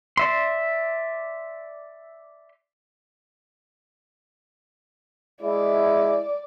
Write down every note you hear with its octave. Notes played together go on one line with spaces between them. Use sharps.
D5 E5 C6
G#3 E4 D5